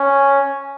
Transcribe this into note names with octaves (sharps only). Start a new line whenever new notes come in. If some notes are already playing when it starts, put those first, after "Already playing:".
Already playing: C#4